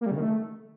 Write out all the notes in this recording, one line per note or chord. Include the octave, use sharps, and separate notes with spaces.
A#3
G3
C#3
D#3
A3